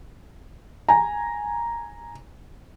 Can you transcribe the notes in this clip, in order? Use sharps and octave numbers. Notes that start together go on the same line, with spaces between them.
G#5 A#5